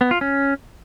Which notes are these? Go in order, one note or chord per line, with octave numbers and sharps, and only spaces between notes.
B3
F4
C#4